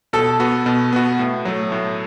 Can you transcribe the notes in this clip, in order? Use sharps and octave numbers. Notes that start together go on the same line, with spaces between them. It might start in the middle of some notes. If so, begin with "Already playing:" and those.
B2 A4
B3 F#4
B2
B3 F#4
A2
F#3 A3
A2